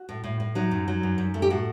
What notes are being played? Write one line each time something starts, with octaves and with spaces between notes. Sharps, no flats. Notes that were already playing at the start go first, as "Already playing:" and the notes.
Already playing: F#4
A2
A2
A2
F#3 D#4
F#2
F#3
F#2
F#2
A3
G4
A2 F#4